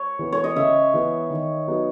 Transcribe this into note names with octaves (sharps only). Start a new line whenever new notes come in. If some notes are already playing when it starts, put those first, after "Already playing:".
Already playing: C#5
E3 B3
C#5
D#5
C#3 E5
E3 B3
D#3
F#3 B3 D#4